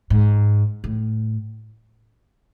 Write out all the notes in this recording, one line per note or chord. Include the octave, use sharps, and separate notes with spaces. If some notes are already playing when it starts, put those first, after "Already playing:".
G#2
A2